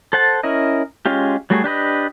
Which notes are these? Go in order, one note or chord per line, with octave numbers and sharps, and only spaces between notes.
A4 C5 F#5 A5
C#4 E4 A#4 D#5
G#3 C#4 F4 G4
F#3 G3 A3 F#4 G#4
D4 G4 B4 D#5